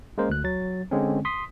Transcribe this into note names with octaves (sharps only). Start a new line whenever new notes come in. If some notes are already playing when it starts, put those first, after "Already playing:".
G#3 A#3 C#4 A#4 C5
D2 F#6
F#3 A6
D3 G#3 C4 C#4
C6 D#6 B6